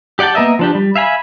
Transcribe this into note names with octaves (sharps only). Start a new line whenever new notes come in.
G4 D5 F#5 G5 A5
A#3 B3 A#4 D#5 E5
F3 D4 G4
G3
E5 F5 G#5 B5